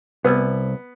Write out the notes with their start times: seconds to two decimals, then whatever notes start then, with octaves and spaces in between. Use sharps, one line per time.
0.24 C2 B3